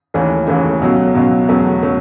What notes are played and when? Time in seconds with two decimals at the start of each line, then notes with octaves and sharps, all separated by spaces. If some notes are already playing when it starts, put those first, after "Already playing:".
0.14 D#2 C#3 E3 A3 C#4
0.47 D#2 C#3 E3 A3 C#4
0.82 C#2 B2 F#3
1.15 C#2 B2 F#3
1.48 E2 C#3 F#3 A3
1.82 C#3 F#3 A3